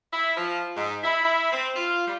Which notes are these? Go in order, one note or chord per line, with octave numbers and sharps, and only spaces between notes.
E4
F3
G#2
E4
E4
C4
F4
G3